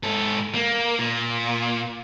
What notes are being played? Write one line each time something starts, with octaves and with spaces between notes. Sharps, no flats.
G#2 A4
A#3
A#2